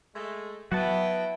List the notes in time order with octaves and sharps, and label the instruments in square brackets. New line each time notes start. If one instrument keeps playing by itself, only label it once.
[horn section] G#3 A3
[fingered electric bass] F#3 [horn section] B3 [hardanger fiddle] E4 G5 [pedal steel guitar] F#4 F#5 A5